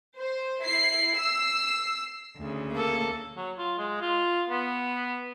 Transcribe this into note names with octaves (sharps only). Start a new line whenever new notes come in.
C5
E4 C7
E6 C7
D2 C#3
A#3 A4
F#3
F4
G#3
F4
B3